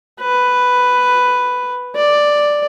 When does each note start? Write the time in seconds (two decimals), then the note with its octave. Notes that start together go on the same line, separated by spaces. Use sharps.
0.21 B4
1.96 D5